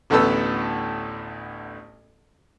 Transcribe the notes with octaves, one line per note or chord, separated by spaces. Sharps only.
A1 D2 A2 B3 A4 E6